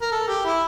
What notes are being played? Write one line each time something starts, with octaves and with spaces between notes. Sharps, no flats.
A#4
A4
G4
E4